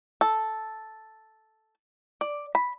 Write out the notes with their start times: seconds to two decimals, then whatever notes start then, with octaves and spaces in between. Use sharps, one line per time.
0.21 A4
2.21 D5
2.55 B5